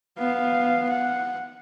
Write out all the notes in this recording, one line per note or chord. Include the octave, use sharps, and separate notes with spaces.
B3 F5
F#5